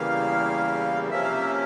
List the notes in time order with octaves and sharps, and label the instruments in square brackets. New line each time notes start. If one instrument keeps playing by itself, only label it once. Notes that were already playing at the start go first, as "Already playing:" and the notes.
Already playing: [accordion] E2 C#3 E3 G3 A#3 F5
C3 F3 A#3 C#4 E5
F5
E5